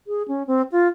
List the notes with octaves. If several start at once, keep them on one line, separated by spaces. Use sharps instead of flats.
G#4
C#4
C4
F4